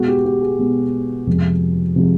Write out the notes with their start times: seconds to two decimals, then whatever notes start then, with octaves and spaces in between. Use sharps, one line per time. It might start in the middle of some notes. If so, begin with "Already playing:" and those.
Already playing: B2 G#3 B3 F#4
0.08 G4
0.25 G4
0.42 G#4
0.59 B2 G#3 B3
1.27 F2 C3 F3 G#3
1.96 C3 F3 G#3